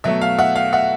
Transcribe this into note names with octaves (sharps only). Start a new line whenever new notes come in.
B2 F#3 A3 E5
F5
E5 F#5
F5
E5 F#5